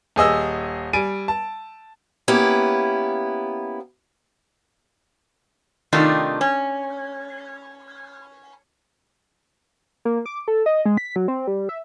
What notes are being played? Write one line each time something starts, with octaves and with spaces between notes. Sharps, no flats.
D#1 G#4 D#5 E6
G3 G#5 D7 D#7
A5
A#3 B3 C#4 E4 G4
C3 D#3 A3 D4 D#4 F4
C#4
A#3
D6
A4
D#5
G#3
B6
F#3
C4
G3
E5